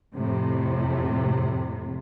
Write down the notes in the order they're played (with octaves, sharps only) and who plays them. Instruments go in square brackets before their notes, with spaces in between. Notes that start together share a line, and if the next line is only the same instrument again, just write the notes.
[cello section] F2 A2 C3